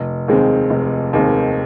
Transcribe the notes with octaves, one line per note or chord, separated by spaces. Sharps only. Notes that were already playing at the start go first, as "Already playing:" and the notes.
Already playing: F1
D#2 D#3 G#3 C4
F1
D#2 D#3 G#3 C4